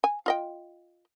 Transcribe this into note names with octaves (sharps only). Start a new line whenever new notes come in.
G#5
F4 D#5 G5